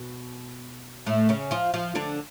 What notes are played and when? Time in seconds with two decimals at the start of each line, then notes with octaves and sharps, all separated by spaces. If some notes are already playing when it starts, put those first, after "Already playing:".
Already playing: B2
1.06 A2 A3
1.29 C#3 C#4
1.51 F3 F4
1.74 F3 F4
1.95 D3 D4